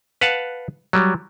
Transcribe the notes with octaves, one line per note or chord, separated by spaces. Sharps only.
B4 F5 F#5 A5
F#3 G3